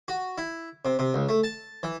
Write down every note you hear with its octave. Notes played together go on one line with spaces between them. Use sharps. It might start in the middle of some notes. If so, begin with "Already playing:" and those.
F#4
E4
C3
C3
C#2
A3
A5
E3